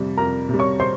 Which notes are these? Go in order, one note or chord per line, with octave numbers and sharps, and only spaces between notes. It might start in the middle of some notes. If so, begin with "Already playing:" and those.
Already playing: F2 C3 G3
F2 A#4 A#5
C3
G3
C#5 C#6
C5 C6